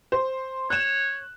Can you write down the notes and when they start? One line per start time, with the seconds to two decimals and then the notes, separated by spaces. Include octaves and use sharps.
0.12 C5
0.70 C#5 F#6 E7